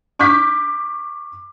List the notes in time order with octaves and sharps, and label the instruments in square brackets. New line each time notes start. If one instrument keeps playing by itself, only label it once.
[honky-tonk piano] C#6 D6 F6 G6 B6